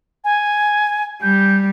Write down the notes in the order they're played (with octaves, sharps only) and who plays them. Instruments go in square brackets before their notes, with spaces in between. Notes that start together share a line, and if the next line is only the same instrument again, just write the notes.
[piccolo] G#5
[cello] G3 [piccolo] G6